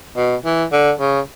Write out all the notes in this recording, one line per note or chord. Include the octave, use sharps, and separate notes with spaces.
B2
E3
D3
C#3